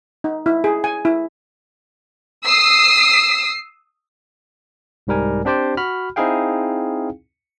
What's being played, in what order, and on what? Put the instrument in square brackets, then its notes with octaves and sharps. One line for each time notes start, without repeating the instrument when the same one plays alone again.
[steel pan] D#4
E4
G#4
G#5
E4
[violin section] D#6 E6 C7
[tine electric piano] C2 G#2 G3 A#4 G#5
C4 D4 G4 C5 D5 G5
F#4 B5 F6
C4 D#4 E4 G#4 F5 G5